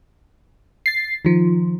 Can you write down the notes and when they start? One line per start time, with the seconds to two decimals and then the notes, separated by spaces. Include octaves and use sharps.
0.86 A6 C7
1.25 D#3 F3